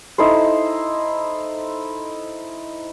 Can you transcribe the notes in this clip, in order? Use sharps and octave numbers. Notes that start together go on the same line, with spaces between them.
D#4 E4 A4 C5